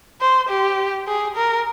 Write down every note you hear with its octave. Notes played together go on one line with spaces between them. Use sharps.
C5
G4
G#4
A#4